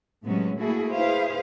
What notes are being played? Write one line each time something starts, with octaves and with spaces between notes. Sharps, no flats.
A2 C3 F#3 G#3 B3 C#4
A3 A#3 E4 F#4 G#4 A4
E4 G#4 B4 C5 F5